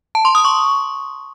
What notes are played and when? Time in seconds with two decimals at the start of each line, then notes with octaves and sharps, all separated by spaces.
0.15 A5
0.25 C6
0.35 D#6
0.45 C#6